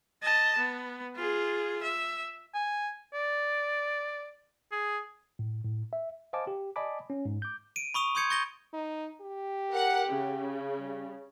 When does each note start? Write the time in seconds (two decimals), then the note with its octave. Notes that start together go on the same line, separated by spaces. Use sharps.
0.23 D#5 A5
0.58 B3
1.16 F4 G#4
1.82 E5
2.54 G#5
3.14 D5
4.72 G#4
5.39 A2
5.65 A2
5.93 E5
6.33 C5 D#5 F5 G#5 A5 D6
6.47 G4
6.76 D5 D#5 G#5 A5 B5 D6
7.10 C#4
7.25 G#2
7.42 D6 G6
7.76 D7 D#7
7.94 B5 C#6 D#6 F7
8.15 C6 D#6 G6 G#6 C#7
8.30 C#6 G6 A6 A#6 D#7 G7
8.74 D#4
9.21 G4
9.71 A#4 F#5
10.08 C#3
10.79 G3